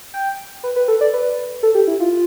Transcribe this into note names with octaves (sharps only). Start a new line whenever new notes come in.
G5
B4
B4
A4
D5
B4
A4
G4
E4
F4